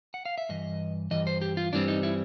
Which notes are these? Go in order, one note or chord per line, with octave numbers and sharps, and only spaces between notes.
F#5
F5
E5
G2 E3 D#5
G2 E3 D#5
C5
G4
F4
G2 E3 G3 C4 D4
D#4
E4